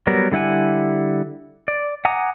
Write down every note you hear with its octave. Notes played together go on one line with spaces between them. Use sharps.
F#3 G3 B3 A#4
D3 G3 E4 F#5 G#5
D5
F#5 G#5 A#5 D6 D#6